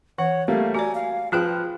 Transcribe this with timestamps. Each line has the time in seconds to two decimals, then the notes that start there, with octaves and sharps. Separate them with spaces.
0.18 E3 C#5 F#5
0.48 G3 A3 A#3 F5
0.74 F#4 D5 G#5 A#5
0.95 F5
1.32 F3 F4 G#4 B4 G5 F#6